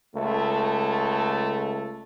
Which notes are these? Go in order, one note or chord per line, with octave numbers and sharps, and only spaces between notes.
C#2 A3